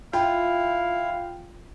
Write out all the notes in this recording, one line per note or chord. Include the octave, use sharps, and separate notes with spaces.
E4 F4 F5 G5